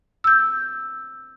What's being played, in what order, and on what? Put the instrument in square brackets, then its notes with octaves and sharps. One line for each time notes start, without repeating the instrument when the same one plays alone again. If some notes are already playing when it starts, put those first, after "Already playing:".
[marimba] E6 G6